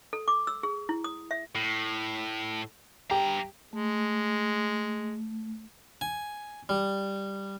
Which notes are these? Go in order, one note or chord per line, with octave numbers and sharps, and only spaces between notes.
A4
D6
E6
G#4
E4
D#6
E5
A2
G2 G4 A#5
G#3 A3
G#5
G3